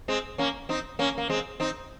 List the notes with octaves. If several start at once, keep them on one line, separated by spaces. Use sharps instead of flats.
G#3 C4
A#3 C#4
C4 D#4
A#3 C#4
A#3
G#3 C4
C4 D#4